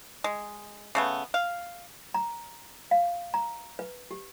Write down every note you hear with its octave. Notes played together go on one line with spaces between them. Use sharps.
G#3
C#3 A3 B3
F5
A#5
F5
A#5
B4
G4